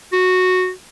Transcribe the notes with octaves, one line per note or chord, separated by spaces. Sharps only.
F#4